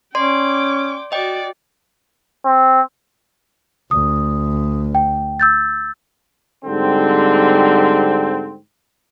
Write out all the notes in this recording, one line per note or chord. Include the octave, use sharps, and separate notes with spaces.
C#4 D5 G5 C6 D6
F#4 D5 D#5 G5
C4
D2 D#6
G5
E6 G6 A6
G#2 D3 G3 C4